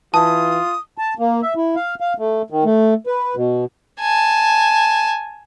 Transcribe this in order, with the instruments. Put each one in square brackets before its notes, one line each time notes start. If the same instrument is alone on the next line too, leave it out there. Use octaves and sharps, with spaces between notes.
[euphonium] E3 [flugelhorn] F4 [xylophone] A5 [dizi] D#6
[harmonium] A5
A#3
E5
E4
F5
F5
A3
D#3
A3
B4
B2
[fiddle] G#5 A5